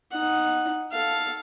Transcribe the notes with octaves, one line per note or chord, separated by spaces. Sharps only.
D#4 F#5
A4 F5